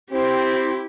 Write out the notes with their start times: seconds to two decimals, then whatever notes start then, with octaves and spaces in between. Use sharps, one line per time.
0.11 C4 E4 G4